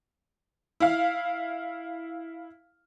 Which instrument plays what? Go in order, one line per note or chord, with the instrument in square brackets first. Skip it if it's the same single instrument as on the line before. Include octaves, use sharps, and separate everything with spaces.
[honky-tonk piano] E4 F5